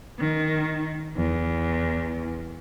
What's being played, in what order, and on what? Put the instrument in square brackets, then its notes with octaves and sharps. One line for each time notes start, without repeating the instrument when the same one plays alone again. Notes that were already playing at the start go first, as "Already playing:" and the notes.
[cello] D#3
E2